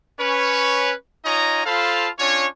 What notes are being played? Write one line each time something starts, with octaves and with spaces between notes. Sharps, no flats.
C#4 B4 C#5
D#4 F4 C#5 D#5 G#5 A#5
F4 A4 C5 F5 A5 B5
C#4 D4 F4 C#5